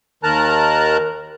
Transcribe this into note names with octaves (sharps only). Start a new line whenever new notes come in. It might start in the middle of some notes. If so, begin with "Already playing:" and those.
D#2 D#3 A#4 A5 A#5 F#6